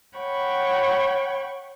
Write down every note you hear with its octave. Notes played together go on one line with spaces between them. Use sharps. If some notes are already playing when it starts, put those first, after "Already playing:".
C#5 F#5 G5 B5 C#6